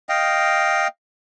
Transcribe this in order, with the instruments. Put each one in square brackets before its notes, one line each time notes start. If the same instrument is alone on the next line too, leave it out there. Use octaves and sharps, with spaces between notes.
[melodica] D#5 F5 G5